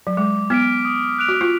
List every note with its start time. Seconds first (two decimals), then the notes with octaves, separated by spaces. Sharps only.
0.07 F#3
0.17 G#3 D6
0.50 B3 F6 B6 D7
0.85 D#6
1.19 F#6 D7 F7
1.28 F#4
1.41 F4